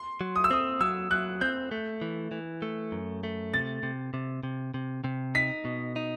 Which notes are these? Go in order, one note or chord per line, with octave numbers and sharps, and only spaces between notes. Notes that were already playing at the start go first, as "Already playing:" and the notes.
Already playing: C6
F#3
D#6
E6
C4 D#6
F#3 E6
F#3 F#6
C4 G6
A3
E3
E3
A3
F#2
A3
C3 A6
C3
C3
C3
C3
C3
D#4 B6
B2
D#4